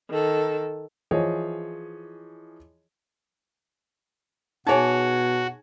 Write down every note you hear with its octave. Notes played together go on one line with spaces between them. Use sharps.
D#3 A4
E3 F3 G#4 C#5 D#5
B2 D#4 F#4 G#4 C#5 G#5 A5